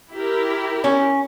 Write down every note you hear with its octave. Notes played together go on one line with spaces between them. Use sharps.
E4 G4 A#4
C#4